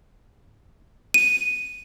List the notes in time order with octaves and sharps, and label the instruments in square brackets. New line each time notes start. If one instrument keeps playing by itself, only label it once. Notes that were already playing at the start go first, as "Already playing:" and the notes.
[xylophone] D#7